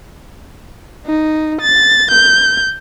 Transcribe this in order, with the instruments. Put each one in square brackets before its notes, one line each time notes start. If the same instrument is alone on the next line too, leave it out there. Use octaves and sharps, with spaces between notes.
[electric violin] D#4
A6
G6